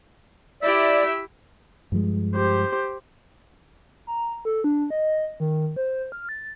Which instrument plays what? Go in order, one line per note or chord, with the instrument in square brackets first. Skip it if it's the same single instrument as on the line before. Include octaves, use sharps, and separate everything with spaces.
[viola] E4 G4 [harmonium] D5 [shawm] E5
[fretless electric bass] G2 F3 G#3
[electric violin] G4 C5
[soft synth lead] A#5
A4
D4
D#5
D#3
C5
F6
A6